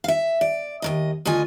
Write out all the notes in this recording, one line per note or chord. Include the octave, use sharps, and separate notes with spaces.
E5 F5
D5
D#2 G#2 D#5
D2 F4 D#5 G#5